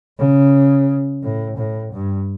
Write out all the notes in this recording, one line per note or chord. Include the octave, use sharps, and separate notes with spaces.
C#3
A2
A2
G2